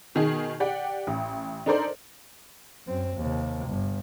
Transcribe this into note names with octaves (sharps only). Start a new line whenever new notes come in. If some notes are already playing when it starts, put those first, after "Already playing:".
B2 D#3 D#4 G#4
G4 D5 F#5 G5
A1
D4 D#4 A4 A#4 C5 D5
F#2 C4
D#2 C3
G1